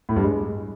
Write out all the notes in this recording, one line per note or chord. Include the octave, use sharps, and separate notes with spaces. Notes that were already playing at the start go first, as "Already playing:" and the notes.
A2
G2
G#3